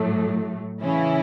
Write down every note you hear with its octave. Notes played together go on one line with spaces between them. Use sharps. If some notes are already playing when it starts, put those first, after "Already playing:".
Already playing: A2 F#3 A3
C#3 E3 C#4 E4